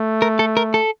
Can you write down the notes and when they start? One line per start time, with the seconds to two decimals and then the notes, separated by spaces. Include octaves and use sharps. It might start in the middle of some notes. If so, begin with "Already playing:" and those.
Already playing: A3
0.22 A#4
0.39 A4
0.57 A#4
0.74 A4